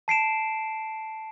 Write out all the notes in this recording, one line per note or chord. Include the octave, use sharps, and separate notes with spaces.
A5 C7 D7 E7